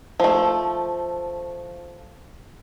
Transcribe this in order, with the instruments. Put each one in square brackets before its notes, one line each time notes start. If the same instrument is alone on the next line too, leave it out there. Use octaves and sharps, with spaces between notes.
[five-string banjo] F3 A3